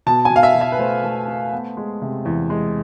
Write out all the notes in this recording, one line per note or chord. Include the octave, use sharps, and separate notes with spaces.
B2 A5
B2 G#5
F5
E5
B2
E5
B4
A3 C5
A3
A3
B3
G#3
C3
E2
G#3